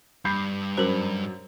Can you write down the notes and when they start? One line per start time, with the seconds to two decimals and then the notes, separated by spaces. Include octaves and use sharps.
0.25 G2 B5 G6 C7
0.78 F#2 A#4 C5